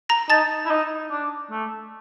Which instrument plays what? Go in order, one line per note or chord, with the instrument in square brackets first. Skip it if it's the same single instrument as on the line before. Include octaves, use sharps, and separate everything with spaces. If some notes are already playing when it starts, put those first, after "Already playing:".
[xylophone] A#5 A#6
[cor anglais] D#4 [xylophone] A5 A6
[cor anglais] E4
D#4
D4
A3